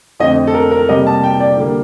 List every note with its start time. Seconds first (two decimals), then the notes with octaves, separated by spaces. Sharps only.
0.20 F2 D3 A3 C4 D#5
0.47 A4
0.54 A#4
0.71 A#4
0.89 C3 G3 A#3 D#5
1.07 A5
1.24 G5
1.40 D5
1.57 D3 G3 A#3